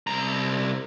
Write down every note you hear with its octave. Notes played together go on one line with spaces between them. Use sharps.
C2 A#5